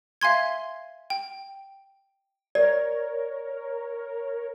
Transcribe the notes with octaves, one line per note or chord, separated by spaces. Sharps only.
E5 F5 G#5 C6 G#6
G5
A#4 C#5 D5